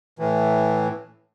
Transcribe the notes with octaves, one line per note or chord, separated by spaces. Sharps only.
A2 E3